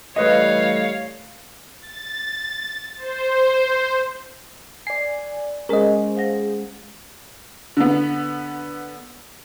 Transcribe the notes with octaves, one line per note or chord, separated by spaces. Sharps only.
E3 G3 A3 B4 C#5 D#5 F5
A6
C5
D5 G#5 C7
G#3 C#4 G#4 A#4 C5 D#5
F5 F#5 A#6
D3 B3